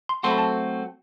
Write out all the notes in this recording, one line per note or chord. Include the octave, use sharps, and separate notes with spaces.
C6
F#3 A3 C4 F#4 A4 C6
B5
A5